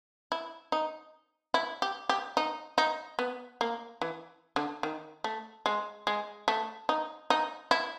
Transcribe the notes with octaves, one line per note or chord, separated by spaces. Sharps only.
E4
D#4
E4
G4
G4
D#4
D#4
B3
A#3
E3
D3
D#3
A3
G#3
G#3
A3
D#4
D#4
E4